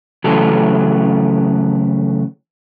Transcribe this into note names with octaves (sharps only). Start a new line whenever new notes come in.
C#3 E3 F#3 A3 G4 A4